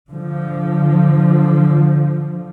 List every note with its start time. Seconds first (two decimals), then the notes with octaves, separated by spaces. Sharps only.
0.11 D3 F3